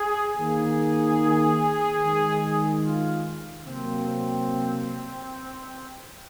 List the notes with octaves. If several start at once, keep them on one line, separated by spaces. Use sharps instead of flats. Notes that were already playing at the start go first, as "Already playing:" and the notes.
Already playing: G#4
D#3 A#3 G#4
D#3 G#3
F4
C3 F#3 A#3 C4
C4